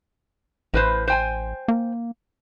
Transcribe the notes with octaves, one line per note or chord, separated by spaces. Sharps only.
A1 A2 B4 C5
C5 G5 G#5
A#3